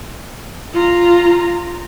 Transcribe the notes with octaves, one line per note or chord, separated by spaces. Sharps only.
F4 A#5